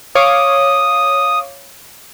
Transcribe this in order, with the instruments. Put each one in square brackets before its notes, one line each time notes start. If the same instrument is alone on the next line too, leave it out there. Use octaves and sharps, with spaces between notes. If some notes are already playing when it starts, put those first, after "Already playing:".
[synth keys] C#5 F5 D6 [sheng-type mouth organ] D#6